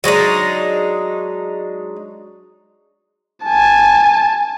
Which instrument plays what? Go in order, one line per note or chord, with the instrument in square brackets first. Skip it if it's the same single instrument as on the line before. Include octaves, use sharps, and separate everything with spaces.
[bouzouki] F#3 G#3 D4 D#4
[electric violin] G#5 A5